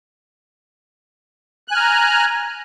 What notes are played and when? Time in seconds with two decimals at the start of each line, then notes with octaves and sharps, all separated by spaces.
1.68 F#6
1.71 G#5
1.74 F6
1.77 A#5